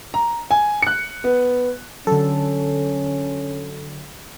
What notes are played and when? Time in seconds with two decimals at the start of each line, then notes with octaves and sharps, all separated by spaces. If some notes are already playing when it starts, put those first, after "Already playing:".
0.14 A#5
0.51 G#5
0.82 F#6 C#7
1.24 B3
2.07 D3 F#3 C#4 A4